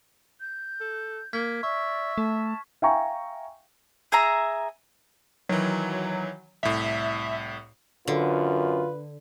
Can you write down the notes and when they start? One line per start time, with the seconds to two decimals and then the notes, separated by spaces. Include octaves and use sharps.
0.40 G6
0.80 A4
1.33 A#3 F6 G#6 B6
1.63 D5 E5 C#6
2.18 A3 A5
2.82 E5 F5 G5 G#5 A#5 C#6
4.12 G#4 E5 A#5
5.49 D#3 E3 F#3
6.63 C2 A2 E5
8.07 F#2 D3 F4 B4